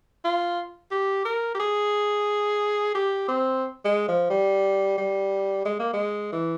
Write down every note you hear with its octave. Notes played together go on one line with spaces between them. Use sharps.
F4
G4
A#4
G4
G#4
G4
C4
G#3
F3
G3
G3
G#3
A#3
G#3
E3